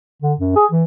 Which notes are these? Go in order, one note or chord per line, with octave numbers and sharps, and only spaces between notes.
D3
F#2
G#4
E3